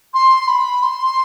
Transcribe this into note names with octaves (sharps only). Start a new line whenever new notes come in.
C6
B5
C6